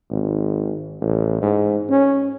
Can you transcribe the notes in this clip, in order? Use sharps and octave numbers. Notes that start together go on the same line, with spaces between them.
G#1
A1
G#2
C#4